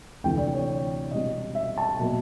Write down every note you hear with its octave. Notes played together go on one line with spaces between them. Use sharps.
D2 C3 E3 G5
D5
C#5
B2 G3 C4 D#5
E5
A5
B2 F#3 A#3